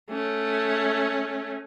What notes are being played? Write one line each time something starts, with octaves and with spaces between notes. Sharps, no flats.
A3 C#4